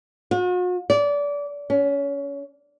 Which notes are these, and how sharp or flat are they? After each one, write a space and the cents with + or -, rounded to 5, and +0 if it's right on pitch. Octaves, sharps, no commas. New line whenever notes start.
F#4 -45
D5 -25
C#4 +25